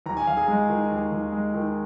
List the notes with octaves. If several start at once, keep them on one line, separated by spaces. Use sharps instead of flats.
D#2 A#5
G#5
D#2 F5
G#4 G#5
G#3
D#3
D#2
D#2
G#3
D#3